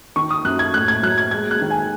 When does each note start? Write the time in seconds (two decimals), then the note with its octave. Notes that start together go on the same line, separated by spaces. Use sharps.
0.16 D#3 C#6
0.31 D#6
0.44 F#2 F#6
0.59 G#6
0.74 A2 F#6
0.88 G#6
1.03 F#3 F#6
1.18 G#6
1.31 G#3 G#6
1.51 F#6
1.61 D#3
1.71 G#5